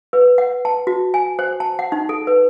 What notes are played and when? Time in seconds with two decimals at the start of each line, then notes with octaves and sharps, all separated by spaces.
0.13 B4
0.38 F#5
0.65 A5
0.87 F#4
1.14 G#5
1.39 C5
1.60 A5
1.79 F#5
1.92 D#4
2.09 A4
2.27 B4